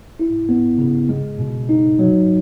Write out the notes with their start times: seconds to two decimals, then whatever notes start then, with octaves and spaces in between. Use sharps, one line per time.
0.19 E4
0.49 B3
0.78 C#3
1.09 G#3
1.39 B2
1.69 D#4
1.99 F#3